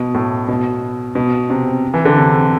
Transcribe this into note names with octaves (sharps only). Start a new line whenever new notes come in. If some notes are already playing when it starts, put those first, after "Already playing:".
Already playing: B2
A2
B2
B2
C3
E3
D3
C3